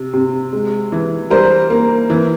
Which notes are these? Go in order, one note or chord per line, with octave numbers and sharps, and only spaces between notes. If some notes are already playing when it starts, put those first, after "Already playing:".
Already playing: C3
C3
G#3
E3
G3 A#4 C5
A#3
E3